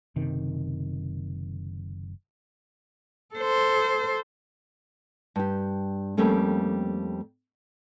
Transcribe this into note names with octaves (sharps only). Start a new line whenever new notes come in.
F#1 C3 D#3
A4 C5
G2 G4
F2 G3 A3 A#3 C#4